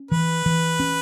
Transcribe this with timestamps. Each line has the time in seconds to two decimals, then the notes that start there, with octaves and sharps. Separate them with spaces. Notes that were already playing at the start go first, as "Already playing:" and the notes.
Already playing: C#4
0.11 E3 B4
0.46 E3
0.80 C#4